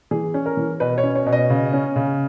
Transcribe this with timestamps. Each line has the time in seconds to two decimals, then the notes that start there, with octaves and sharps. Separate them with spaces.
0.11 E3 G#4
0.34 C#4
0.46 A#4
0.57 E3
0.80 B2 B4
0.98 C#5
1.03 C#4
1.15 C#5
1.26 B2
1.33 D#5
1.50 C#3
1.73 C#4
1.96 C#3